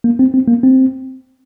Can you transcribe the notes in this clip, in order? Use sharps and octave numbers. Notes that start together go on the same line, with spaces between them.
A#3
C4
C4
A#3
C4